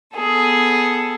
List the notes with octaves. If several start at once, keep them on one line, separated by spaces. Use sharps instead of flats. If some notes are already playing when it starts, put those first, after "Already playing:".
B3 G#4 A4